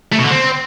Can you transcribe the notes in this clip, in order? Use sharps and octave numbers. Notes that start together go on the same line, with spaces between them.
A3
B2
D3
C4